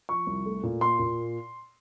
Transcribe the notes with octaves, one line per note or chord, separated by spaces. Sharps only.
F3 C#6
C2
A3
A#2
A#3 C6
A#2